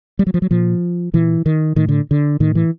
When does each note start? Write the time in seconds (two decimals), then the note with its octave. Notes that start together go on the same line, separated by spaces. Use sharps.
0.19 G3
0.27 F#3
0.34 F3
0.42 F#3
0.51 A#2 F3
1.13 A#2 E3
1.46 D#3
1.76 A2 D#3
1.89 D3
2.11 D3
2.40 A2 D#3
2.55 E3